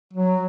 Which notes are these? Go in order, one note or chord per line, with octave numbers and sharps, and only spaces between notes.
F#3